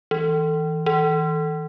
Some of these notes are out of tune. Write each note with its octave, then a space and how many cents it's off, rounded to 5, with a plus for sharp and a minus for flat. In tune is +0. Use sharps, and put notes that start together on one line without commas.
E3 -30
E3 -45